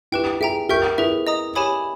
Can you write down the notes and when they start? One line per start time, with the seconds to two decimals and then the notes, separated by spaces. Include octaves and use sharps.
0.12 E4 G4 B4 G5
0.41 G#4 E5 G5 A#5
0.69 G4 A#4 E5 G5 C#6 G6
0.98 E4 G#4 B4 E5
1.27 D#5 A#5 D#6
1.55 G4 C#5 G#5 B5 D#6